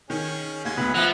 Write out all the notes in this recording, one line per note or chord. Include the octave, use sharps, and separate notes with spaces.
D#3 C#4 G#4
D#2 G#3 F#4 G#6
D2 B3
F3 E5 F#5 A#5 D#6